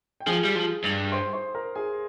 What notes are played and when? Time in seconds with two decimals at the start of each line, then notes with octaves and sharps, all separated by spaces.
0.20 G5
0.26 F3 G#4 G#5
0.44 G3
0.55 F3
0.84 G2
1.12 C5 C6
1.33 C5 C6
1.55 A#4 A#5
1.76 G#4 G#5